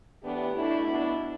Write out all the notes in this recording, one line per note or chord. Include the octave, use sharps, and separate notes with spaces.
A2 E3 B3 D4 G4
B2 A3 D4 E4
B2 B3 D4